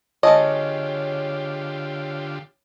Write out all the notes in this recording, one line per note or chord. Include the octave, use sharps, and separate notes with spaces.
D3 G#3 F4 G4 A4 C#5 D#5